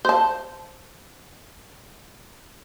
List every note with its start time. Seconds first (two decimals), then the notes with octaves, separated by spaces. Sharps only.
0.05 C5 A5